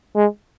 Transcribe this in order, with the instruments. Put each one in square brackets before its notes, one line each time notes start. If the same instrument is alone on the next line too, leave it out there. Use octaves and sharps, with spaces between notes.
[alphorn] G#3